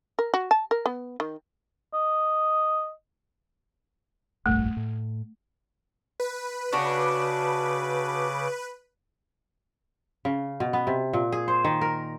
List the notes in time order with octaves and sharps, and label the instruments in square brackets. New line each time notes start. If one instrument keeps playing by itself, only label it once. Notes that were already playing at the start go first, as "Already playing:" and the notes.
[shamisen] A#4
F#4
A5
A#4
B3
D#3
[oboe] D#5
[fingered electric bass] F1 A#1 G2 [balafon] A3
[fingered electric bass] A2
[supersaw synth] B4
[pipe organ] C#3 D6 [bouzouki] C#4 D4 F#4
[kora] C#3
B2
B3
C3
A#2
G#4
C5
D#3
A#4